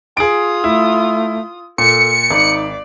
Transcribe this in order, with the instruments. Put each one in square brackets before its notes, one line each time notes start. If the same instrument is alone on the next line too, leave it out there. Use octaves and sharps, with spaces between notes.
[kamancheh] F4 D#6 [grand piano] G#4 D7
[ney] A3 [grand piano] E4
[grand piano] A#2 [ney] A4 [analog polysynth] C#7
[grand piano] G#1 [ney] D#4 [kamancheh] D5